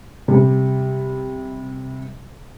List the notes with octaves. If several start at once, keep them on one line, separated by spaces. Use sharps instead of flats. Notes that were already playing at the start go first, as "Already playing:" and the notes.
C3 G3